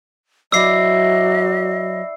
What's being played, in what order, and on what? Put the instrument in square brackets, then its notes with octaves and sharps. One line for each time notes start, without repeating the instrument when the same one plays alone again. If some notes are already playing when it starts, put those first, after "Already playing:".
[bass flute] F#3 [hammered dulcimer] E4 D5 [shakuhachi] D#5 [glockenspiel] E6 C7